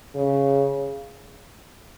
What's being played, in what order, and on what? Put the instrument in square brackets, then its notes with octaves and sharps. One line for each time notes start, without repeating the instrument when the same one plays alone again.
[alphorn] C#3